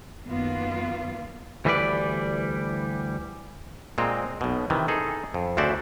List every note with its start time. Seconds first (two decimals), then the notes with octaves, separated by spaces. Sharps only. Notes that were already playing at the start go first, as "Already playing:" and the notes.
0.25 F#2 D#3 A#3 B3 F4
1.65 D2 E3 G3 F4 B4 D5
3.98 A#2 G#3 C4 D#5 A#5
4.41 B1 B2
4.70 C3 D#3 E3
4.88 D#4 G#4 A4
5.34 F2
5.57 D2 C#3 F#4 C5 D5 E5